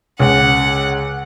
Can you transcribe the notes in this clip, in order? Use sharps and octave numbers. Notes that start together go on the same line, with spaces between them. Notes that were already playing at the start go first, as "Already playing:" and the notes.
C#2 F#5